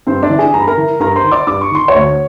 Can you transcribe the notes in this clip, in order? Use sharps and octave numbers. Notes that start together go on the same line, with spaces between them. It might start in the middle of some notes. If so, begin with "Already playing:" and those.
G2 C4 C5
D4 D5
E3
G#4 G#5
G2 A#5
B5
A#4 A#5
E3
G2 A#4 A#5
C5 C6
D#3
D5 D6
G2 D6
C#6
D#3 C6
C#5 C#6
D2